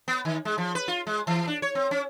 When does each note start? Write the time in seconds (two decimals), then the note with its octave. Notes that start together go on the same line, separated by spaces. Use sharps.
0.08 B3
0.25 D#3
0.45 G#3
0.58 F3
0.75 B4
0.88 F4
1.07 G#3
1.27 E3
1.47 D4
1.62 C#5
1.75 C4
1.91 C#4